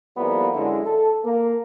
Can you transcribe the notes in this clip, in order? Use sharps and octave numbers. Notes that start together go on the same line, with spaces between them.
F2 G3 A#3 B3 E4 F4
F#2 D3 G#3 E4
A4
A#3